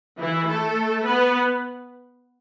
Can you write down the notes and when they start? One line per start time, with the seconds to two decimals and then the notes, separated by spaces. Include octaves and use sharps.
0.20 E3 E4
0.49 A3 A4
1.07 B3 B4